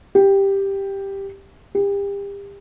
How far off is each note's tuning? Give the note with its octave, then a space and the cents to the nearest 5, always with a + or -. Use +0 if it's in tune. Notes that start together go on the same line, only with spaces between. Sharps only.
G4 +5
G4 +35